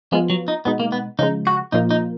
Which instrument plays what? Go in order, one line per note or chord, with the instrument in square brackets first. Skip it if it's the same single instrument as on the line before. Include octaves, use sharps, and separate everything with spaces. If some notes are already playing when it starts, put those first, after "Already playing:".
[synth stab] F3 B3 F4 [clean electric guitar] G#3
[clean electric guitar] F#3
D#4
[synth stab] B2 G#3 D#4 [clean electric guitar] B3
[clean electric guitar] A#3
B3
[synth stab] C#3 F3 G#3 [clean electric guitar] D#4
[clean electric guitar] F#4
[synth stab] A#2 F3 A#3 F4 [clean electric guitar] D#4
[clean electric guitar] D#4